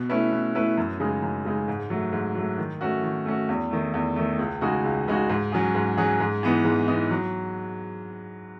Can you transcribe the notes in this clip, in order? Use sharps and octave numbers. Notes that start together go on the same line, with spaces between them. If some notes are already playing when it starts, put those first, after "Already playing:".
Already playing: B2
A3 C#4 E4 B4
B2
A3 C#4 E4 B4
F#2
C#3 G#3 D#4
F#2
C#3 G#3 D#4
G#2
F#3 A3
G#2
F#3 A3
D#3
A3 C#4 F#4
D#3
A3 C#4 F#4
E2
D#3 A3
E2
D#3 A3
C#2
C#3 G#3 D#4 F#4
C#2
C#3 G#3 D#4 F#4
G#2
F#3 C#4 G#4
G#2
F#3 C#4 G#4
G#2
E3 B3 D#4
G#2
E3 B3 D#4
F#3